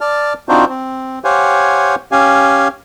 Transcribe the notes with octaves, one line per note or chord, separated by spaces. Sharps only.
D5 A5 F6
C4 D4 D#4 F4 F#4 C5
C4
G4 C5 C#5 F5 F#5 G#5
C#4 G4 F5 G#5